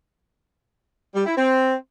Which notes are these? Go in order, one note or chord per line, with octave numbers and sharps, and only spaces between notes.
G3
E4
C4